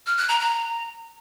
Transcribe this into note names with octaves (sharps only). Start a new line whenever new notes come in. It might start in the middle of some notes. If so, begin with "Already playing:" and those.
F6
F#6
A#5
A#5